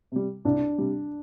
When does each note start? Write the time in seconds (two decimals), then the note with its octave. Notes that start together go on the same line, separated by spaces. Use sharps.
0.12 C3 G3
0.45 C2 D4
0.78 C3 G3